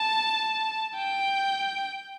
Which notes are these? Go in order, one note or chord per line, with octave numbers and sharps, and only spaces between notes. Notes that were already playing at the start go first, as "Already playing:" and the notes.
Already playing: A5
G5